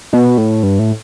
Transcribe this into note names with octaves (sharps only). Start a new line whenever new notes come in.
B2
A2
G2
A2